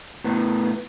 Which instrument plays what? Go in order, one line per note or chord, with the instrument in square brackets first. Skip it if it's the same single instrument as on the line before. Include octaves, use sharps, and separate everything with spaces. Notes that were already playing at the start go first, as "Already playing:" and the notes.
[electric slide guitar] A2 B3